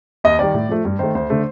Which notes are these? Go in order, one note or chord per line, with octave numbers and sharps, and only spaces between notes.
D#2 D#5
D#3 G3 D5
A2
F3 A3
G2
D#3 A3 C5
D2 C5
D3 A3